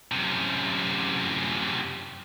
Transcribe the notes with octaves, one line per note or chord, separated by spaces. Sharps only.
F#2 C3